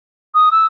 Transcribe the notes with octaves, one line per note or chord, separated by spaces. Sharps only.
D#6
E6